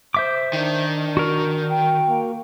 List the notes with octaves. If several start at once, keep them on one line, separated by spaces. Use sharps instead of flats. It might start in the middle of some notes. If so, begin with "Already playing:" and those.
C5 E5 D6
D#3 D4
F#4 A#4
G5
A#3